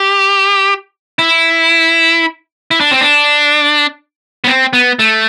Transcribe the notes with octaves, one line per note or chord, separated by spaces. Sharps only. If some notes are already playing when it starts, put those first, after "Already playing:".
Already playing: G4
E4
E4
D4
C4
D4
B3
C4
B3
A3